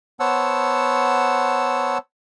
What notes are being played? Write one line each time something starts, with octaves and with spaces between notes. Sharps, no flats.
B3 C5 C#5 F#5 A5 E6